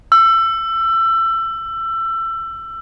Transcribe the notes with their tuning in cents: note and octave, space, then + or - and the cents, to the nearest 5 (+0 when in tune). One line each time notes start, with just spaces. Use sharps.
E6 +25